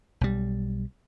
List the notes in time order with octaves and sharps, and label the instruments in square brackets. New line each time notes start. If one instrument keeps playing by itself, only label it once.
[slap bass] B1 G3